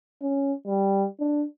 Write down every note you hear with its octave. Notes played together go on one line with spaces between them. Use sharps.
C#4
G3
D4